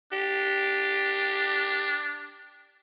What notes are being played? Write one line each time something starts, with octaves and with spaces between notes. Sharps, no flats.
D4 G4